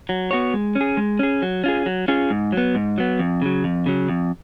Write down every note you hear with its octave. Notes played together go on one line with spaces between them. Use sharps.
F#3
B3 F#4 C#5
G#3
C#4
G#4
G#3
C#4 G#4
F#3
C#4 F4 G#4
F#3
C#4 F4 G#4
G#2
F#3 B3
G#2
F#3 B3
F2
C#3 F#3
F2
C#3 F#3
F2